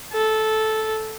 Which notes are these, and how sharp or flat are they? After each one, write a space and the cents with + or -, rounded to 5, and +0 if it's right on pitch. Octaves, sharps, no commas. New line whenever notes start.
A4 -10